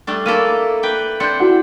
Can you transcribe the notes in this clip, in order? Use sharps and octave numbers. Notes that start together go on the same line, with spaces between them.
G3 A3 D4
A#3 E4 A4 D#7
B4 G5
C4 D4 G6 C#7
E4 F#4 F#5